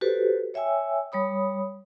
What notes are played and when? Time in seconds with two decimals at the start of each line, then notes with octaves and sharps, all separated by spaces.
0.01 F#4 G4 A4 B4 C5
0.54 C#5 E5 G5 G#5 E6
1.12 G3 C#5 B5 D#6